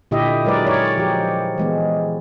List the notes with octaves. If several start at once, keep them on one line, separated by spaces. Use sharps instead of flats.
A#2 D3 E4 G4 D#5 E5
F#3 G#3 A#4 B4 D5
D#4 A#4 C#5 D5
F3 G4
E3 G#3 B3